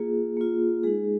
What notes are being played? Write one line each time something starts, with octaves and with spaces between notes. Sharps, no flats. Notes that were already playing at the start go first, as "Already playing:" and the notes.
Already playing: A#3 F4 G#4
A#3 F4
G#3 D#4 G#4